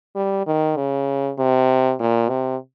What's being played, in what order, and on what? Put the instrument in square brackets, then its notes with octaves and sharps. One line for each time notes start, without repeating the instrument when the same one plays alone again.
[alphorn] G3
D#3
C#3
C3
A#2
C3